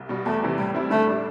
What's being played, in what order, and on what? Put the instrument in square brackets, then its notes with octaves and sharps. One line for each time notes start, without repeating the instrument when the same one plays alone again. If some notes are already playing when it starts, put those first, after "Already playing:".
Already playing: [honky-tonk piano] C2
B2 G3
[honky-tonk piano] E2 [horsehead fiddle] A3
[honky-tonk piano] C3 E3 G3
[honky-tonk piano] A2 [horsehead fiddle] G3
[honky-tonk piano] G3 C4 E4
[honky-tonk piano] D3 [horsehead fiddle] A3
[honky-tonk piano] G3 D4